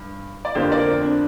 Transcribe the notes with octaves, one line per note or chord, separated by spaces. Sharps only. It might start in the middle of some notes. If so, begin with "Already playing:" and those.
Already playing: G2
D5
F2 D3 A#3 G4 C5
A#4 D5
C4
D4